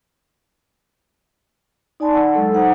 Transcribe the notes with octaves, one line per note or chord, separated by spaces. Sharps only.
D#4 D5 G#5 A5 B5 C6
F#5 C#6 E6
F#3 G#3 A4
D#4 C5 F#5 A#5 D#6